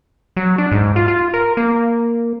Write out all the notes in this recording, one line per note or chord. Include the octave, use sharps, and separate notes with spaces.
F#3
D4
G#2
F4
F4
A#4
A#3